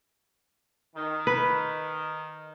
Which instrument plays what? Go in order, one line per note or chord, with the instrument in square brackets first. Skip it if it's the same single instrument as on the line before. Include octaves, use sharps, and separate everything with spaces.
[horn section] D#3
[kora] B4